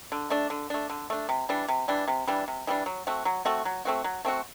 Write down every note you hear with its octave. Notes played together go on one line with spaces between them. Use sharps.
D3
A3 D4
D3
A3 D4
D3
A3 D4
C3
E3 G3 D4
C3
E3 G3 D4
C3
E3 G3 D4
C3
E3 G3 D4
F#3
A3 C4 F#4
F#3
A3 C4 F#4
F#3
A3 C4 F#4
F#3
A3 C4 F#4